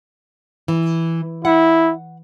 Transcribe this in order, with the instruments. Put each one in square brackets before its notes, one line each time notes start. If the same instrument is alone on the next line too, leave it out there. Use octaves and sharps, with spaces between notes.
[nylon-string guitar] E3
[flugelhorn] E4 [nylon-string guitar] F#5